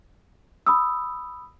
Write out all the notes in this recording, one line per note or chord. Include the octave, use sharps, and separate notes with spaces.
B5 D#6 E6